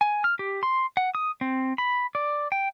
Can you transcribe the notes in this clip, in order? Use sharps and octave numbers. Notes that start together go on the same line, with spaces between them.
G#5
F6
G4
C6
F#5
D#6
C4
B5
D5
G5